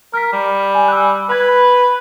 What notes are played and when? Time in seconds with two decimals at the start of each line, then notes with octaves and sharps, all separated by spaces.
0.14 A#4 F6 B6
0.33 G3
0.75 G#5
0.88 E6 F#6
1.30 B4 B5 G#6